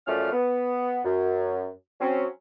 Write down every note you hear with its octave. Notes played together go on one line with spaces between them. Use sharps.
F#2 F3 A3 C#4 D5 F6
B3
F#2
F#3 C4 C#4